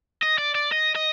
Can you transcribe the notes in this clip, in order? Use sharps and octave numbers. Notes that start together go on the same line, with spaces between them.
D#5
D5
D5
D#5
D#5